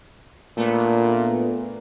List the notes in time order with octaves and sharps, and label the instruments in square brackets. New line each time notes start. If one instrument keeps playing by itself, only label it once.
[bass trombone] A#2 [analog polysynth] A3 B3 D4